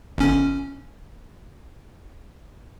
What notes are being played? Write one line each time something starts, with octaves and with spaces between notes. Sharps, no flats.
G1 C#4